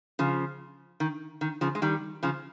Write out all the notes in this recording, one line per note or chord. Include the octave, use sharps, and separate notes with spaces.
C#3 F3
D#3
D#3
C#3 F3
G#3
D#3 G3
C#3 F3